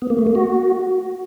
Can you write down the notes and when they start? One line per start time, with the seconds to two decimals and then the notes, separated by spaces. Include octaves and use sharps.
0.02 B3
0.10 A#3
0.18 A3
0.27 A#3
0.35 F#4